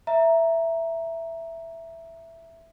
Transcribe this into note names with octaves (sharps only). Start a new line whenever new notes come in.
E5 A#5